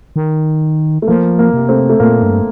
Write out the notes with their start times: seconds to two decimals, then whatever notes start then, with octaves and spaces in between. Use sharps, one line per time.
0.16 D#3
1.02 A3
1.07 F3 A#3
1.39 A#3
1.54 C3
1.69 A3 C4
1.89 A3
2.00 A#2 A#3
2.23 G2